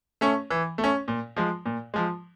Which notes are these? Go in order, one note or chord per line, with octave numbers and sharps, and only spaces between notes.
A3 C#4
E3
A3
C#4
A#2
F3 G#3
A#2
F3 G#3